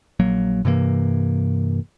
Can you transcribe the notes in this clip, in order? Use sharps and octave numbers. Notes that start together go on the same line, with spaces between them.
A#1 F#3 A#3
G2 C3 E3 A#3